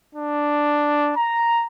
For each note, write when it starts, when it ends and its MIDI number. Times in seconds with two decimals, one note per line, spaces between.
0.14 1.11 62
1.16 1.66 82